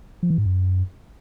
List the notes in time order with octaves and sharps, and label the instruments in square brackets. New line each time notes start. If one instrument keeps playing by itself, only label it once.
[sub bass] F3
E3
G#2
F#2